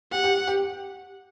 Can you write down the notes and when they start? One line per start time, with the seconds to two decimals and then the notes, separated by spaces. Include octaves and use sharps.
0.12 G4 F#5
0.24 G4
0.47 G4